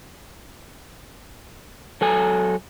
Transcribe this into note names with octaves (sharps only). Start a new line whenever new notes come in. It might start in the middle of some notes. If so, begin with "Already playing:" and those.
F#3 A4 G#5